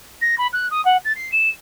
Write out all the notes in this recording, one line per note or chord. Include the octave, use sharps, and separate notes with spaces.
A#6
B5
F#6
D#6
F#5
A6
C7
E7